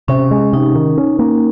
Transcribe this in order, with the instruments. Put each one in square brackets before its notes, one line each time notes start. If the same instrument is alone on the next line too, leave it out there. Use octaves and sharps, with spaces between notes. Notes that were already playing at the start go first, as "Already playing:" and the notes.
[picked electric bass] C3 [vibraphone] C#4
[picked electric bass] G#3
[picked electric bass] C3 [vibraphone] D#4
[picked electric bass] D#3
C#4
A#3